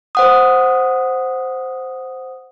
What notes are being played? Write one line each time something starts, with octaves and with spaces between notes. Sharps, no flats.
C5 F#5 D#6